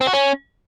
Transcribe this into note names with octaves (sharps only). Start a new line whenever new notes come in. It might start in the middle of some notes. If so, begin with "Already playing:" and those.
C4
F#4
C#4